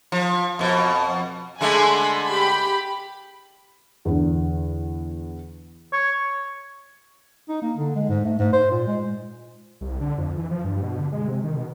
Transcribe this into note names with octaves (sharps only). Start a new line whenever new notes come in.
F3
F2 B2
D3 G#3 A3 G#5 B5 C6
G4 B5
E2 D3
C#5
D#4
A#3
D3
G#3
G#2
A3
G#2
C5
A#2
G#3
C2
D3
F2
E3
F3
G2
B2
D3
G#3
C3
D#3
B2